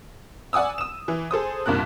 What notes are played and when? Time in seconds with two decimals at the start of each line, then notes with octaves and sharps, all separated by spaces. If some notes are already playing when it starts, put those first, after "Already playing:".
0.53 D5 F#5 G#5 D#6 E6
0.78 D#6 E7
1.08 E3
1.31 G#4 A4 C5 D#6
1.66 C2 G2 A#2 A#4 F#6